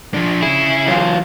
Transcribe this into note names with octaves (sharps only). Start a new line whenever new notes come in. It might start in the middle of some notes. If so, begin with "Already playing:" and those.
F3 D4
C#3 E4 G#4
E3 F#3 F4